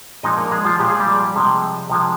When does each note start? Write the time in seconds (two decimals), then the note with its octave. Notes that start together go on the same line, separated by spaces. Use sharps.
0.23 A#2 F3 G#3 D#4 D#5
0.37 A#3 A#4
0.51 G#3 G#4
0.65 F3 F4
0.79 A#2 F3 G#3 G4
0.89 G#4
1.00 G3 G4
1.34 C3 F3 G#3
1.90 C3 F3 G#3